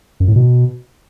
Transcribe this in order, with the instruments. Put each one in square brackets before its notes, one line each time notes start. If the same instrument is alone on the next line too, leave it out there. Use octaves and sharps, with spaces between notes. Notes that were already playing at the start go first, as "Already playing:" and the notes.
[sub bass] F#2
A2
B2